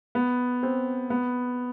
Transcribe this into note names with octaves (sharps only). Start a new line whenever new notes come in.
B3
C4
B3